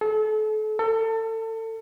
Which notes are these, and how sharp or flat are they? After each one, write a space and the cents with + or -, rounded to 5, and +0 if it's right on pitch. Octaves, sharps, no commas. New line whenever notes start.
A4 -35
A4 +30